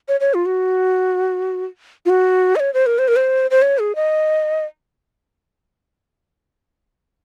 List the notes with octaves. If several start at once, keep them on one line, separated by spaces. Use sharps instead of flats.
C#5
C#5
F4
F#4
F4
F#4
D#5
C#5
C5
A#4
C5
A#4
C5
C5
C#5
G#4
D#5